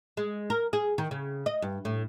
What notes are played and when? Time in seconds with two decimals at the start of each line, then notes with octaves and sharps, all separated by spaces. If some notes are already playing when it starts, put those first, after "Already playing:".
0.17 G#3
0.50 A#4
0.73 G#4
0.98 D#3
1.11 C#3
1.46 D#5
1.62 G2
1.85 A2